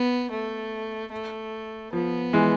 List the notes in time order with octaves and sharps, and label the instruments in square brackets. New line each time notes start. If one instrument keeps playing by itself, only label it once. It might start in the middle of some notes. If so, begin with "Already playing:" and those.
Already playing: [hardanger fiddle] B3
A3
A3
[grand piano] F3 [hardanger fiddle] B3
[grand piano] E3 G#3